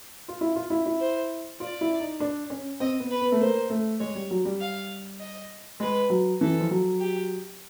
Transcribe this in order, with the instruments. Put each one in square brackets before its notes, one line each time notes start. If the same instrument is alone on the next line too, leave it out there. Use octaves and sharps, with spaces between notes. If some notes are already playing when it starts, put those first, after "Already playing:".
[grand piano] F4
E4
F4
E4
E4
[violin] C5
[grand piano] F4 [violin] D5
[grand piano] E4
D#4
D4
C#4
[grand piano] C4 [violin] D#5
[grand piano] B3
[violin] B4
[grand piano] B3
A3
[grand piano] A#3 [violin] C5
[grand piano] A3
[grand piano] G#3 [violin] C#5
[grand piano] G3
F#3
G3
[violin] F5
D#5
[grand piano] G#3 [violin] B4
[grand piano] F#3
[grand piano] E3 [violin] A4
[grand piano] F3
F#3
[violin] G4